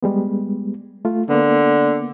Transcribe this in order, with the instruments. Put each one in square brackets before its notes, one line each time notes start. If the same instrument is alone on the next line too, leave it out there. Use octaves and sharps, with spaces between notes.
[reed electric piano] G3 G#3 B3
A3 F4
[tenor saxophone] D3 [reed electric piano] A#3 B3